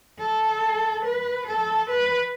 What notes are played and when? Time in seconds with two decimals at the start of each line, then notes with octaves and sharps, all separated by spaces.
0.19 A4
1.05 B4
1.47 A4
1.90 B4